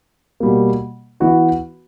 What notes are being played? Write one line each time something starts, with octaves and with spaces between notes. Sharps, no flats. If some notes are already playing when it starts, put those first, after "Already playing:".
B2 G3 A#3
E3 B3 F#4 B4